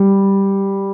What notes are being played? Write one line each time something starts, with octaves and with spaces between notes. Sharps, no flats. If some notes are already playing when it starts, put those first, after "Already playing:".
Already playing: G3